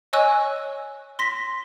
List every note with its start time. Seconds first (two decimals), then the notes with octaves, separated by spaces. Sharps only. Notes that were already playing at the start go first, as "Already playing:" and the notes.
0.13 C#5 D#5 G#5 C#6 E6 F#6
1.19 C6 A#6 B6